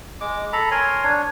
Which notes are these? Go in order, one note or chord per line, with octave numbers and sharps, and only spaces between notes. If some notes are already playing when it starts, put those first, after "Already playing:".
G#3 D6
A4 A#5 B5
A#4 C#5 G#5 C6
D4 C#5